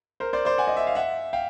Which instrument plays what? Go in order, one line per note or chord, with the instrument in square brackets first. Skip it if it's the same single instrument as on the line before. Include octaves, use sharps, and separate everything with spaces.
[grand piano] A#4 C5
C5 D5
C5 D5
F#5 G#5
D#5
E5
F5
E5 F#5
F5 G5